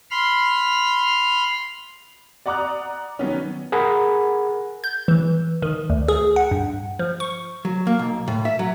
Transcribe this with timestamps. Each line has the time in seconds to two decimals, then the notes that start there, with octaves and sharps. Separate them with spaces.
0.11 B5 C6 F6
2.46 D5 F#5 A#5 D6 D#6 F#6
3.19 D#3 F#3 B3 C#4
3.72 G#4 A#4 F#5 B5
4.84 G6
5.08 E3
5.62 D#3
5.90 D2
6.08 G#4
6.36 F#5
6.51 G2
6.99 F3
7.20 C#6
7.65 F#3
7.87 A#3
7.99 B1
8.28 A2
8.45 E5
8.59 F#3